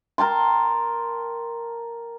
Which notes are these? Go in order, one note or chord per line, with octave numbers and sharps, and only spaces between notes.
A#4 G5 A5 C6